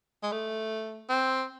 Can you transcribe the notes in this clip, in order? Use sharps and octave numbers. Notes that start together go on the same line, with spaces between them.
G#3
A3
C4